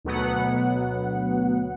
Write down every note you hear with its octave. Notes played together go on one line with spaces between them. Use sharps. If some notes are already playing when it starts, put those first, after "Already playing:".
D2 B2 F#3 B3 F#5